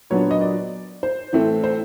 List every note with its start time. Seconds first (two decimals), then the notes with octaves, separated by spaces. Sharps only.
0.10 A#2 F#3 B3 D4 C#5
0.31 D#5
0.41 D5
1.03 C5
1.33 A2 E3 A3 C4
1.64 C5